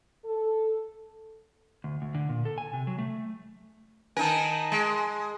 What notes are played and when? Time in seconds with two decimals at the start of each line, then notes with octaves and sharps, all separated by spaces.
0.24 A4
1.84 D2
2.02 D2
2.15 D3
2.29 A#2
2.45 A4
2.58 G#5
2.73 C3
2.87 F#3
2.98 A3
4.17 D#3 D#4 A#4 G#5 A5
4.72 G#3